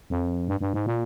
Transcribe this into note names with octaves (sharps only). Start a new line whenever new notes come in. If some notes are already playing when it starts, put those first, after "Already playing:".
F2
G2
G2
G#2
A#2